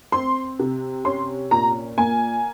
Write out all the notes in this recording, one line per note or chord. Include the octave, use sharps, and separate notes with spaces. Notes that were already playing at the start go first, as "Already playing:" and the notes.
C4 C6
C3
C#4 C6
A#2 A#5
A#3 G#5